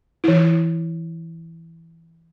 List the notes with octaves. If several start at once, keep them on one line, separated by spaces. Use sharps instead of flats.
E3 E4